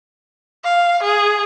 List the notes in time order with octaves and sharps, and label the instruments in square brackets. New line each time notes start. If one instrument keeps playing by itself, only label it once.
[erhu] F5
G#4